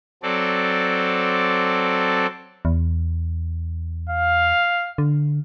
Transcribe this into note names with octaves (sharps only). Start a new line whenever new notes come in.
F#3 C4 A4 D5
E2
F5
D3